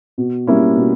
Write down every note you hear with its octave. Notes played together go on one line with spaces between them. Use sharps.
B2
G3 A#3 C#4 E4
B2